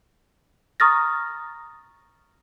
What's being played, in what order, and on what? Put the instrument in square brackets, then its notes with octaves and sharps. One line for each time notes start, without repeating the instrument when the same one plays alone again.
[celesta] A#5 C#6 D#6 F6 A6 A#6